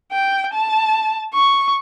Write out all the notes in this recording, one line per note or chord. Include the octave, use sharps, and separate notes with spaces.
G5
A5
C#6